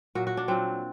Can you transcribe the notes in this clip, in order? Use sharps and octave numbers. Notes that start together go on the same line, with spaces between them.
A#2 F#3 F#4
F#4
D4
A#2 F#3 C4